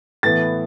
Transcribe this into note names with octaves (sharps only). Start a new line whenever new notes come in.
A2 E3 B3 A6